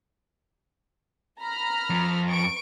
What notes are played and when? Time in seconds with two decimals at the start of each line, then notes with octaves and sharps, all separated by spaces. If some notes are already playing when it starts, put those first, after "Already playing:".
1.41 A#5 B5 F6
1.90 F2
2.28 C#6 D7